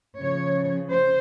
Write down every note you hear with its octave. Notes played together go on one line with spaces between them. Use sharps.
C#3 F3 C#5
C5